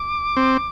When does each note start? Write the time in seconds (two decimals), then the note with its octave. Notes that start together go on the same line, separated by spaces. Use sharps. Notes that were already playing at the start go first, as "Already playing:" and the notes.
Already playing: D6
0.37 C4